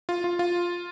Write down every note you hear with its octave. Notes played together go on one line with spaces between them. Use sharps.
F4
F4
F4